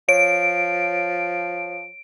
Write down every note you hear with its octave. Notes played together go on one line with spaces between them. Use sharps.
F3 C#5 D7